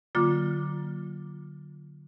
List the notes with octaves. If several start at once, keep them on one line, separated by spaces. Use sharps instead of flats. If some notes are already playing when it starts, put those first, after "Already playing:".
D3 F#3 A#3 F4 D6